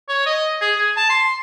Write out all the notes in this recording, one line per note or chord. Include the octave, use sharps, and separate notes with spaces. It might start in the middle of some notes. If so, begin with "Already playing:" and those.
C#5
D#5
G#4
G#4
A5
C6